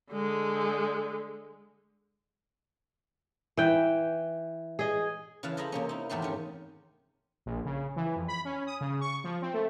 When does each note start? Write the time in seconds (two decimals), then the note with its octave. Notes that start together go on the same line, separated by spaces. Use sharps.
0.11 D3 G#3
3.57 E3 G5
4.79 G#4 D#5
5.43 C#3 E3 B4 F5 A5
5.57 A4 C5 D#5 G#5 A#5 B5
5.72 C3 A#3 C#4
5.89 D#4 E4
6.09 E2 G#2 A3 G4 C6
6.22 D#3 C#4
7.46 A#1
7.65 C#3
7.96 E3
8.15 F2
8.28 B5
8.45 C#4
8.67 D#6
8.81 C#3
9.01 C#6
9.24 F3
9.42 C4
9.54 A3